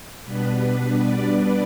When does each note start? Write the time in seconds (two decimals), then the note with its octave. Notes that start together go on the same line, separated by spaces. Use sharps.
0.24 B2 G3 B3 D4 B4
1.02 D5